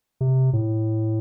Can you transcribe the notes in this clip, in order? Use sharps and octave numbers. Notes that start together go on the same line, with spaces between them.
C3
A2